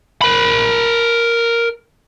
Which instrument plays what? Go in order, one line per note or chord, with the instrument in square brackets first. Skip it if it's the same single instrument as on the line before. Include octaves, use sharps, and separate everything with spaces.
[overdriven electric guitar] A#4 B5